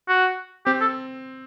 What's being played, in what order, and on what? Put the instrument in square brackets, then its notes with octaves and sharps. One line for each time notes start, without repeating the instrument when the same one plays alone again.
[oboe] F#4
[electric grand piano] C4 [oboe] G4
[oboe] A4